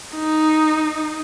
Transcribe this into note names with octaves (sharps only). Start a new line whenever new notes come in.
D#4